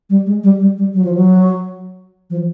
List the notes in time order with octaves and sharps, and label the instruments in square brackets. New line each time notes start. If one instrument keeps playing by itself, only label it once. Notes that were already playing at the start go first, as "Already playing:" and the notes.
[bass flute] G3
G#3
G3
G3
G3
F#3
F3
F#3
F3